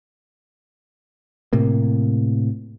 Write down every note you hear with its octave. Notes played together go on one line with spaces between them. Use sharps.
A2 C3 A#3